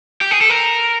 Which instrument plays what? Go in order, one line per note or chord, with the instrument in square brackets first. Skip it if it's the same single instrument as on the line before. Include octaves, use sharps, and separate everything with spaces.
[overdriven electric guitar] G4
G#4
A4
A#4